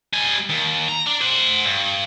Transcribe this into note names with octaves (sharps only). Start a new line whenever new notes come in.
G3 G#5
D#2
A#5
D4
C5 F#5
G2